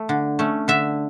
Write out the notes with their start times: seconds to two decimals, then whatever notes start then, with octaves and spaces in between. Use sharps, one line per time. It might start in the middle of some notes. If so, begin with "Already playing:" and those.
Already playing: A3
0.09 D3
0.39 A3 C#4
0.68 D3 E5